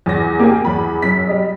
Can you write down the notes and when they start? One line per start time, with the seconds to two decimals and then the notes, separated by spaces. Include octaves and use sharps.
0.06 E2 A#6
0.39 A#3 G4 G#5
0.65 E2 B5
1.02 F#2 B6
1.27 G3 D#5